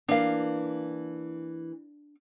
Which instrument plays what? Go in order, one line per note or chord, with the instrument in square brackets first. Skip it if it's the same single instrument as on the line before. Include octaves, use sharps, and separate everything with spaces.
[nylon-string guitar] E3 A#3 [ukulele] D4 F5